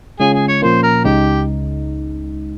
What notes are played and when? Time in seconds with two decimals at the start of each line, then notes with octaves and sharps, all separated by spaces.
0.20 C#3 G#3 C#4 F4 G#4
0.34 G#4
0.48 C#5
0.62 A#2 F3 A#3 C#4 C5
0.83 A#4
1.04 C#2 C#3 G#3 D#4 G4